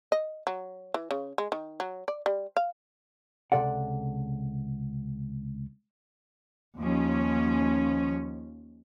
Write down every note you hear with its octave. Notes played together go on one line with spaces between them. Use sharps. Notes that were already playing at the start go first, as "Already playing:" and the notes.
D#5
F#3
E3
C#3
G#3
D#3
F#3
D5
G3
F5
C#2 F#2 C3 A4 D5 F#5
D#2 F3 C#4